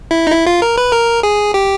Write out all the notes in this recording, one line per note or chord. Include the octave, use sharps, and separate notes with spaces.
E4
D#4
E4
F4
A#4
B4
A#4
G#4
G4